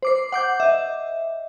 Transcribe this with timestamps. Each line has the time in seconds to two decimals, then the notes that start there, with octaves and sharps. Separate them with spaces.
0.03 C5 D6 C7
0.32 F#5 D6 G6
0.60 D#5 E5